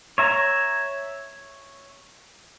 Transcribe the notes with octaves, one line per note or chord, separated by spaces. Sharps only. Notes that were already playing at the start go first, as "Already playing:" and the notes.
C#5 E5 A#5